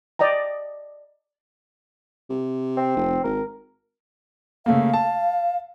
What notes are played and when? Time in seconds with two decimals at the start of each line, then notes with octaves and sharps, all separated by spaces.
0.19 D5 D#5 G5 A#5
2.30 C3
2.77 C4
2.97 F1
3.24 G#1 A#4
4.66 C#3 A3 A#3 F5
4.94 A5